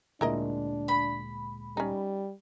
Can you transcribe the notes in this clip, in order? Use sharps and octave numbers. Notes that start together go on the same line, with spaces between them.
D2 A#2 G#3 D4 E4 A#4 D#5
B5
G3 C#4 D#4